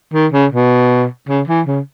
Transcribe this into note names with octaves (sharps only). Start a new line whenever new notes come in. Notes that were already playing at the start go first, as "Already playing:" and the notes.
D#3
C#3
B2
C#3
E3
C#3